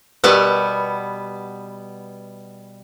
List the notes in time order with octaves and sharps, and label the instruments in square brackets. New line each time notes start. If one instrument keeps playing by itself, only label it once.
[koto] B2 G3 B3 [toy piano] G4 A#4 B4